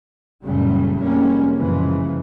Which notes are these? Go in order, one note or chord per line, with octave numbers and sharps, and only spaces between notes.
F#1 A#2 C#3 F#3 G3 A3
F1 G3 G#3 A#3 C#4
F#2 A#2 C#3 E3 F3 G#3